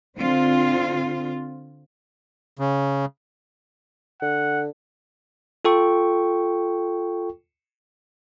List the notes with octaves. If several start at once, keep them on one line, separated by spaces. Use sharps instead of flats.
D3 C4 F4
C#3
D3 F#5
F4 A4 G5 C#6